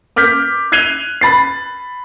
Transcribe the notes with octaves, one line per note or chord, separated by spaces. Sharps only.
D6 F6 G6 B6
F#6 G#6 C7 D#7 F7 G7
B5 A6 C7